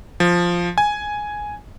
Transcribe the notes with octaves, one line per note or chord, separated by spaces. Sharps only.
F3
G#5